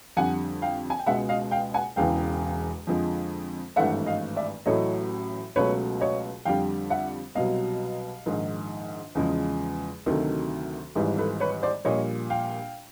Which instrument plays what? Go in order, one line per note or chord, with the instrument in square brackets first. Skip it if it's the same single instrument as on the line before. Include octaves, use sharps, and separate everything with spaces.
[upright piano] F2 D3 G3 F#5 G#5
F5 G5
G#5
G5
C#2 B2 G#3 E5 F#5
D#5 F5
F5 G5
F#5 G#5
E1 E2 C#3 E3 F5 G5
F2 D3 F3 G#3
G#1 G2 E3 A3 E5 F#5
D#5 F5
D5 E5
A1 A2 F#3 A3 C#5 D#5
C#2 B2 F#3 A3 B4 C#5
C#5 D#5
F2 D3 G3 F5 G5
E5 F#5
C2 B2 F#3 D#5 F5
A#1 G#2 D#3
E2 C#3 F3 G#3
D2 C3 D#3 F#3 A3
G#1 G#2 E3 G3
A4 B4
B4 C#5
C5 D5
A#1 A#2 G3 C#5 D#5
F5 G5